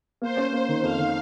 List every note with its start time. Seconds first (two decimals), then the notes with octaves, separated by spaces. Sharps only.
0.22 A#3 C5
0.37 C#4
0.52 A#3
0.69 D#3
0.83 F2 F5
0.99 D#3